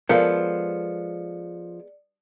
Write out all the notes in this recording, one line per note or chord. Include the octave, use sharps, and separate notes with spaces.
F3 G#3 B3 A4 A#4 D5 F5 C#7